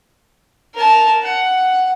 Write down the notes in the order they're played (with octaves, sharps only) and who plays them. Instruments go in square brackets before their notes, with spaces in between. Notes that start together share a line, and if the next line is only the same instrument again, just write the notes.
[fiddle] A#4 A5
F#5